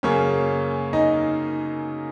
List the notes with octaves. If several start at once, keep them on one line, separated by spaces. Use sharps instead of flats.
F#2 C#3 A#3 C#4 C#5
D#4 D#5